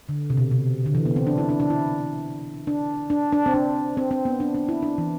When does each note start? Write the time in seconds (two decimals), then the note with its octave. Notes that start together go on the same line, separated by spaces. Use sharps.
0.09 D3
0.30 C3
0.37 B2
0.51 C3
0.86 D3
0.95 E3
1.05 B3
1.16 C4
1.27 D4
1.38 E4
1.49 D4
1.60 D4
1.70 E4
2.67 D4
3.10 D4
3.33 D4
3.46 C4
3.54 D4
3.97 C4
4.11 C4
4.25 B3
4.40 D4
4.54 D4
4.69 E4
4.82 D4
4.98 E3